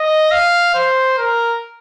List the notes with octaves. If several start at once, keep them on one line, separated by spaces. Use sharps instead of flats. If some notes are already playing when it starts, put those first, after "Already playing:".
Already playing: D#5
F5
C5
A#4